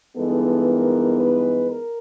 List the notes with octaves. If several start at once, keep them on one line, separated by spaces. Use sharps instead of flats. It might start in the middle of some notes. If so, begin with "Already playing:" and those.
G2 E3 G#3 B3 D#4 A4
A#4
B4
A#4